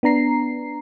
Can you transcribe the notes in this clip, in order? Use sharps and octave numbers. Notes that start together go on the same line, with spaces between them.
B3 D4 A#5 C7